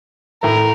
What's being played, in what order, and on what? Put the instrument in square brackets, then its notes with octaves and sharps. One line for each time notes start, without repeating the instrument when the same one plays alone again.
[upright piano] A2 A3 [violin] A#4